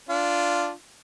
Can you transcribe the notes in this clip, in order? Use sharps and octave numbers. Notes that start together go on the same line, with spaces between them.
D4 F4